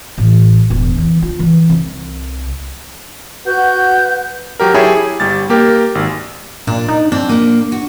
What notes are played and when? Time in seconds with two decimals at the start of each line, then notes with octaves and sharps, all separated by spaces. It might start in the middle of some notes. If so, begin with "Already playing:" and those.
0.18 A1
0.70 E1
0.98 E3
1.22 F4
1.39 E3
1.69 C2
3.47 F#4 B4 F#5 G6
4.60 F#3 G4 A#4
4.74 E4 G4 G#4 C#5 A5 B5
4.93 G#4
5.20 G1 G3 A6
5.50 A#3 G4 A#4
5.95 G#1
6.67 A#2 D4
6.88 D#4
7.12 C4 D4
7.29 A#2 A#3
7.72 F#4